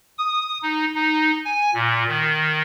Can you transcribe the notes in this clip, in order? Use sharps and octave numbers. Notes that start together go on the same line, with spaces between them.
D#6
D#4
D#4
G#5
A#2
D#3